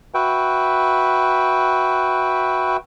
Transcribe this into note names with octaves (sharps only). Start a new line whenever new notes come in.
F#4 B4 E5 G5